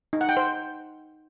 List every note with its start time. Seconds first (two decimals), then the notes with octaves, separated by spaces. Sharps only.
0.13 D#4
0.21 F#5
0.29 G5
0.37 C5